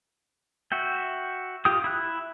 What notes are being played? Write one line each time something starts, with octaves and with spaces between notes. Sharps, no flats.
F#4 E5 G5
F4 G4 G5 D#6
E4 F#6